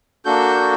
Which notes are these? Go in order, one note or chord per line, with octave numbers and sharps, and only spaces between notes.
A#3 D4 F#4 A4 G6